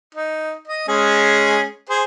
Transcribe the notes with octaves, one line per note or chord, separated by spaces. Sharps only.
D#4
D#5
G#3 C#4 G#4
G#4 C5